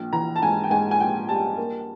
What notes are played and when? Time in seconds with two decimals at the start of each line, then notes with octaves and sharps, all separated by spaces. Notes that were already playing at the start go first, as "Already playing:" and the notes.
Already playing: A#1
0.13 E3 A#5
0.36 A5
0.42 G#2 G#5
0.64 G5
0.70 G#2 G#5
0.91 G#5
1.00 A#1 G5
1.29 G3 A5
1.57 A#3